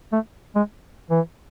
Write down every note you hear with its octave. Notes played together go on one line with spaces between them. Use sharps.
A3
G#3
E3